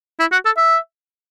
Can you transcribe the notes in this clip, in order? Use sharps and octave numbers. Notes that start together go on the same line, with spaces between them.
E4
F#4
A4
E5